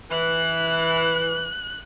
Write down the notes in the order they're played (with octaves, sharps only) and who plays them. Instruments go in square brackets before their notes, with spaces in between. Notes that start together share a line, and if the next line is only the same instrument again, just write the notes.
[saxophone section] E3 [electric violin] F#6